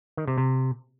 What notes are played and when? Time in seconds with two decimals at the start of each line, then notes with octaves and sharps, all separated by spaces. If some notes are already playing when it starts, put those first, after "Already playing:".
0.17 D#3
0.28 C3
0.38 C3